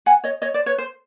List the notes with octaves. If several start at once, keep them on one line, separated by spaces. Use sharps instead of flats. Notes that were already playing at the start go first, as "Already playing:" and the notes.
F#5 G#5
C#5 D#5
C#5 D#5
C5 D5
B4 C#5
C5